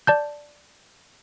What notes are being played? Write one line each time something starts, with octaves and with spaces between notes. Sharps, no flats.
D5 A5 G6